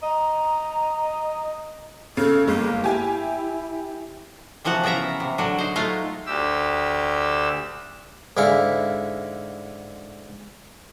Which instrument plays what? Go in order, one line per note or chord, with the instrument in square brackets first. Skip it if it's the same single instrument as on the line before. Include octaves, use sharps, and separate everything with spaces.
[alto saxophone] D#5 [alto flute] A#5
[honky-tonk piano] C#3 [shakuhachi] A4
[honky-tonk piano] G1 G#3 [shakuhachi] A#3
[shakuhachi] E4 [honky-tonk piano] G4 G#5
[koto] C3 E3 F3 F#4 F#5
C#3 B3 A#4 E5 A#5
C3
D3 F#3 D4 F#4
D#4 C5
F#3 G#3 A3 D#4 F4 F5
[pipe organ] D2 G4 E6
[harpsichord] G#2 D3 E4 F5